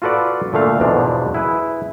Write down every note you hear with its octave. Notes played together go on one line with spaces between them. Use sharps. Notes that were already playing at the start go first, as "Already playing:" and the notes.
F4 F#4 A4 B4 D5
A#2 D3 A3 F5
E2 G#2 B2 F3 G#3 D4
E4 G#4 B4